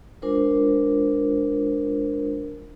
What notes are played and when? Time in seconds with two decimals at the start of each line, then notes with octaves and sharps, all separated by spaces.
0.22 G#3 D4 F4 A#4 C5